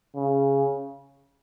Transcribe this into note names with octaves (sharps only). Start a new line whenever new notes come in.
C#3